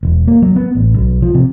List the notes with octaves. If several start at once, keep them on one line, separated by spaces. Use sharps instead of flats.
E1
A#3
F#3
B3
A1
B1
F3
C3